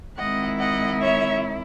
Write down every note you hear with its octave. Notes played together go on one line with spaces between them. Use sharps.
D#3 G#3 C4 E4 D#5 F#5
D#5 F#5
C#5 E5